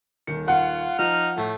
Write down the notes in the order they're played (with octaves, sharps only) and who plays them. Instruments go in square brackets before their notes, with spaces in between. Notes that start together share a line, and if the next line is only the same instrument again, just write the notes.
[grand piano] D#1 D#3 C#7
[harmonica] F4 [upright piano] F#5
[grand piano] F3 [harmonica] D#4 F6
[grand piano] A2 [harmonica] A3